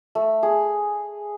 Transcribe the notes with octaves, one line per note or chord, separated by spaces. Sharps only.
A3
G#4